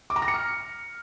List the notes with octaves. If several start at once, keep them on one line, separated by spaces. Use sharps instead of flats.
D6
A#5
A#6
C#7
F6